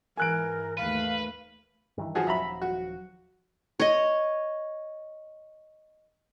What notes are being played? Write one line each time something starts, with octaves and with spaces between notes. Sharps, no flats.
G#2 E3 A#4 G#5 F#6 D7
D#2 A3 B4 F5
G2 D#3 E3
F3 F#4 G#4
D#1 F3 F#3 E5 A#5 B5
F#4
C#5 D#5